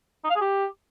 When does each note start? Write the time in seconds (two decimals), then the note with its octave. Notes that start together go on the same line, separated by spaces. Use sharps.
0.24 D#4
0.30 F5
0.36 G#4
0.41 G4